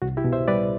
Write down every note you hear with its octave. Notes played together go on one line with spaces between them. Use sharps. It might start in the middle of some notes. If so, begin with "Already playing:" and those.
C2 F#4
E4 G4
B2
C5 E5
G3 B4 D5